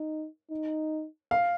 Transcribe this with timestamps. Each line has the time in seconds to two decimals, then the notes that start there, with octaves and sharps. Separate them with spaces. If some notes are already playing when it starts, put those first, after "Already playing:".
Already playing: D#4
0.51 D#4
1.31 F5